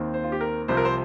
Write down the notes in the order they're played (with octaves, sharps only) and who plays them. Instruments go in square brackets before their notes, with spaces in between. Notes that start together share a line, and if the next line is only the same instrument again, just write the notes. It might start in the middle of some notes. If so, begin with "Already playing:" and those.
Already playing: [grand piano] D#2 D#3 C4
C5
F4
G4
A#4
C2 C3 F3 C4 C5
A#4
C5